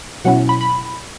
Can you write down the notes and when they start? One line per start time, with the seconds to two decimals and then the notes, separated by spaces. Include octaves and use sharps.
0.24 B2 F#3 C#4 E4 F#5
0.49 B5
0.61 B5